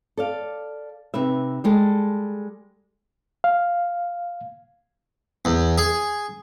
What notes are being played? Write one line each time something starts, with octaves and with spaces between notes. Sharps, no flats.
A4 D5 F5
C3 D#4 B4 E5
G3 G#3 A4
F5
E2
G#4